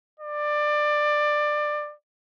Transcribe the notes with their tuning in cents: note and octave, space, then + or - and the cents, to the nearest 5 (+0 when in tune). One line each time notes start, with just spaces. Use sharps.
D5 +20